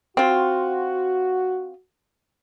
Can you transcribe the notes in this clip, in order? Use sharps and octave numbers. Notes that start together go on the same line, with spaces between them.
C4 F4 F#4